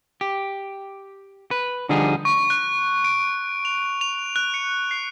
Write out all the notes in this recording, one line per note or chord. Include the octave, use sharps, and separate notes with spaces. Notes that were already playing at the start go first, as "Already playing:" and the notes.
G4
B4
D3 F3 G3 D#4 G#4
C#6
F#6
D7
F7
F7
F#6
C#7
C7